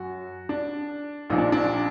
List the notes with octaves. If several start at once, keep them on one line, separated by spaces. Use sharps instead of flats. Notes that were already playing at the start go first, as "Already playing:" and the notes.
Already playing: F#2 F#4
D4
A#1 A#2 F3 D#4
D4
D4